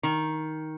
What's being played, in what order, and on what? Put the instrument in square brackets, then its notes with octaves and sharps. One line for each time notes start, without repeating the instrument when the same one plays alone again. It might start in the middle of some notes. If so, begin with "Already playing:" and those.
[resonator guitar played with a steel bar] D#3